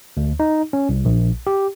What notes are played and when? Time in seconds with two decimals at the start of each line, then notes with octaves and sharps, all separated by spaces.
0.17 D2
0.40 D#4
0.73 C#4
0.89 C2
1.05 A#1
1.47 G4